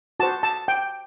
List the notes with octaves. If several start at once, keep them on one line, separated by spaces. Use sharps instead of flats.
F#4 C5 A5
A5
G5